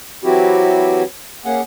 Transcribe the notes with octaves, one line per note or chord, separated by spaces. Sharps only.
E3 F#3 C4 E4 F#4 G4
A#3 C#4 G#4 F#5